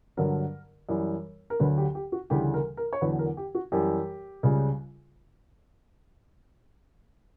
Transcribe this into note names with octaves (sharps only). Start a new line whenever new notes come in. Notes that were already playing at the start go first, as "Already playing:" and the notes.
G2 D3 F#3 A#4
F#2 E3 G3
A#4
D2 D3 F#3 B4
G4
G4
F#4
D2 C#3 E3 G3 G4
A#4
A#4
C#5
E2 D3 F#3 B4
A#4
G4
F#4
F#2 E3 G3 G4
C#2 C#3 G3